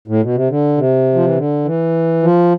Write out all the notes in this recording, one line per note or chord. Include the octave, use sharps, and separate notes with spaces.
A2
B2
C3
D3
C3
F3
E3
D3
E3
F3